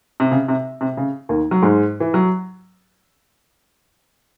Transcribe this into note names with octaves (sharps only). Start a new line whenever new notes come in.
C3
C#3
C3
C3
C#3
D#2 D#3
F#3
G#2 G#3
E3
F#3